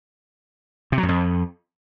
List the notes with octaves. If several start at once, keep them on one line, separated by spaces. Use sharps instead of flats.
C3
F#3
F#2
F2